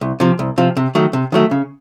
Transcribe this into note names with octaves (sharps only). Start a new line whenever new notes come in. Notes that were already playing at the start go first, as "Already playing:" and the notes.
C2
C3 F3
C2
C3 F3
C3
D#3 F#3 A3
C3
D#3 F#3 A3
C#3